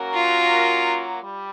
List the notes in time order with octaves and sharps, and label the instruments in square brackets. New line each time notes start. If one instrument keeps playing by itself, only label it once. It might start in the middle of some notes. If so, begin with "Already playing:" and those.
Already playing: [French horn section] F#3 A#3 C#4 F#4 A#4
[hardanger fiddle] F4
[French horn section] G3